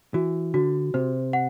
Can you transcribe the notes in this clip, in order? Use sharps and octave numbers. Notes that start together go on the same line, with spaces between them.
E3 F#4
D3 F#4
C3 C5
F#5